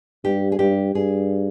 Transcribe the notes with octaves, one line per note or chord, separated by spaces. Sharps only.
G2 G4
G#4
G2 G4
G2 G#4